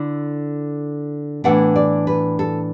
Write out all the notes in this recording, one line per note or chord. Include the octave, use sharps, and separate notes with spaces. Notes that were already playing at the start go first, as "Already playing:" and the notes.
Already playing: D3 E4
A2 E3 B3 D4 F#5
D5
B4
A4